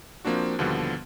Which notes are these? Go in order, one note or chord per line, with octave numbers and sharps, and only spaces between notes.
F3 A#3 C4 D4 F#4
D#2 B2 D3 F3 G3 B3